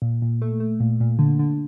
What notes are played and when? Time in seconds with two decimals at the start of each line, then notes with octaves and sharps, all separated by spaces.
0.02 A#2
0.22 A#2
0.42 A3
0.60 A3
0.80 A#2
1.00 A#2
1.19 D3
1.39 D3